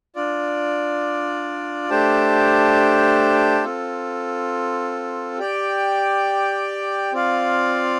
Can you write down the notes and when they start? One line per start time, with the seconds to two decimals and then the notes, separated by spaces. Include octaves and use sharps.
0.16 D4 F4 D5
1.90 A3 D4 G4 C5 A5
3.64 C4 F4 A4
5.38 G4 D5 G5
7.13 C4 F4 D5 F5